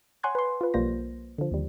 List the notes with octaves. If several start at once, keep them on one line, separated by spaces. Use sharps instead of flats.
C#5 F#5 G#5 C6 F#6 G#6
B4 C6
F4 B4
B1 F3 G3 A#3 C5 A#6
D3 F3
D#2 G3